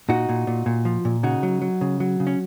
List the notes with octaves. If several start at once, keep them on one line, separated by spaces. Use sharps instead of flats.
A#2 D#4 F#4
A#2
A#2
A#2
F3
A#2
C#3 D#4 F#4
F#3
F#3
C#3
F#3
C#3
C#4